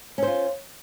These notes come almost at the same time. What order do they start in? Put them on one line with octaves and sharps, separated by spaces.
C#4 C5 F4